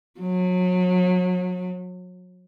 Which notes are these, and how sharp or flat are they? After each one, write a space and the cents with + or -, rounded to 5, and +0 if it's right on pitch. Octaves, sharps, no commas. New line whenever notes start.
F#3 -30